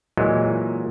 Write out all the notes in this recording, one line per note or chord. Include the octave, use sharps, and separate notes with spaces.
A#2 E3 F#3 G#3